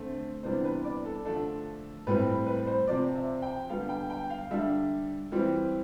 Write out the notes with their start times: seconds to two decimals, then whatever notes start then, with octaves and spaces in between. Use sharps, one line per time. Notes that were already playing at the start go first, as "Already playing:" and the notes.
Already playing: D3 A3 C4
0.43 C3 E3 G3 B3 D4 C5
0.65 B4
0.84 D5
1.05 A4
1.25 D3 F3 A3 D4 A4
2.07 A2 G3 C4 B4
2.47 B4
2.67 C5
2.87 C3 F3 C4 D5
3.15 E5
3.42 G5
3.70 D3 G3 B3 F5
3.89 G5
4.10 G5
4.30 F5
4.50 D3 G3 D4 E5
5.32 E3 G3 C4